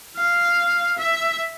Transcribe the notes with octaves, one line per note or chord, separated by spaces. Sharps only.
F5
E5